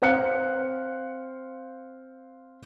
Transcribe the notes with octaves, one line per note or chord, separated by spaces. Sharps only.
C4 C5 F5 F#6 C#7